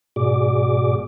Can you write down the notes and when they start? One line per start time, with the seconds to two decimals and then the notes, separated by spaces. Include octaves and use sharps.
0.16 G#2 B2 F#4 G#4 D5 D6